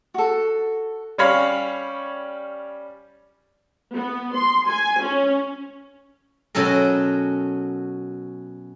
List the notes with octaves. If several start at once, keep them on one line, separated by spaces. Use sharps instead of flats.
F#4 A4
G3 C#4 C#5 F5 B5
B3
C6
G#5
C#4
B2 F#3 C#4 A4 A#4